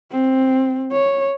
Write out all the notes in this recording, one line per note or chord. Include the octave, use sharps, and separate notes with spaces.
C4
C#5